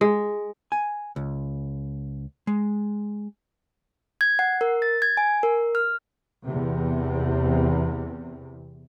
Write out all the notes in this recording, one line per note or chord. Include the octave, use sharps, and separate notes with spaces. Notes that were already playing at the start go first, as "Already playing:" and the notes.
G#3
G#5
C#2
G#3
G#6
F#5
A#4
A6
G#6
G#5
A#4
F6
E2 C3